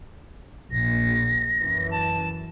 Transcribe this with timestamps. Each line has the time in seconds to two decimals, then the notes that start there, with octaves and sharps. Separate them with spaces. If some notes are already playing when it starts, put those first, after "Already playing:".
0.72 A#1 A#6
1.58 F#2 E3
1.91 A5